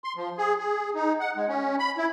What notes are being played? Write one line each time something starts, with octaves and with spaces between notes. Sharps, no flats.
C6
F3
G#4
G#4
D#4
F#5
G#3
C#4
B5
E4